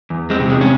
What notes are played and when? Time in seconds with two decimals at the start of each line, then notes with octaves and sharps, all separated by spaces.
0.10 E2
0.30 G#3 C4
0.40 C3
0.50 G#3
0.61 C#4